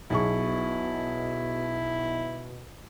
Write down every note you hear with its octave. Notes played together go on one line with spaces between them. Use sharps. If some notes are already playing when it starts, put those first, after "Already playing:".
B1 B2 E4 G#4 C#6